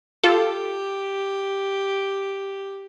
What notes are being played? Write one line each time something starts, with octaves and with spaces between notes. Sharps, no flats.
F4 G4 A4